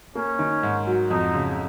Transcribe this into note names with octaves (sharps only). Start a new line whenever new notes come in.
A#3 C#4
D#3
G#2
F#3
F2 D#4
C#3